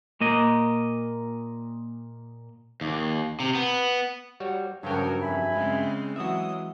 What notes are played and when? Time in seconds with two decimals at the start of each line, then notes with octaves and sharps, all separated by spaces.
0.21 A#2 A#3 D#5
2.81 D#2
3.40 C3
3.55 B3
4.40 G3 F#4 C#5
4.83 G2 C#3 F3 F#3 F#4 A#4 C#5 G5
5.21 F2 E5 G#5 B5
5.52 C#3 G#3 C4
6.16 E3 F#3 G#3 F#4 E5 D#6